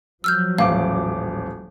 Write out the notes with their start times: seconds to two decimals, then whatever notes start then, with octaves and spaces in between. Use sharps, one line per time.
0.24 F3 F#3 E6 F6 G6
0.58 D#1 A1 F5 D6